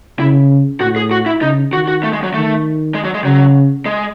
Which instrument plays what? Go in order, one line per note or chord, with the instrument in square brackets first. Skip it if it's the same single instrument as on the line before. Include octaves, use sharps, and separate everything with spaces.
[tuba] C#3 [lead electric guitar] E4
[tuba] A2 [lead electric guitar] F#4
[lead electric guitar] G#4
F#4
E4
[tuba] C#3 [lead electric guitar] D#4
[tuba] D#3 [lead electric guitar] F#4
[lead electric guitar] F#4
A3
G#3
F#3
[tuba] D#3 [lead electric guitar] A3
[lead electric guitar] G#3
F#3
G#3
[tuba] C#3 [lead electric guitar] F#3
[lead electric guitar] G#3